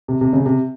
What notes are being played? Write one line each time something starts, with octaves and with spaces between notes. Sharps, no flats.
C3
C3
C#3
C3